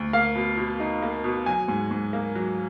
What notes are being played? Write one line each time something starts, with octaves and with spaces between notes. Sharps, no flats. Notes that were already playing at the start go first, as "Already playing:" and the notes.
Already playing: D2
A#3 F5
B2
B2
D#4
A#3
B2
F#3 G#5
G#2
G#2
A#3
F#3